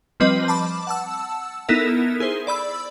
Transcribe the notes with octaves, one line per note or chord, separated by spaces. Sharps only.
F3 G3 C4 B4 D#5
A5 B5 D6
F#5 A5 E6
B3 D#4 E4 A4 A#4 E5
G#4 C5
D5 B5 E6